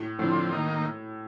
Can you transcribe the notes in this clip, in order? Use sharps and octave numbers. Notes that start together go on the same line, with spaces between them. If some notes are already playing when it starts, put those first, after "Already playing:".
Already playing: A2
A2 D3 F3 C4
D#3 A#3 D#4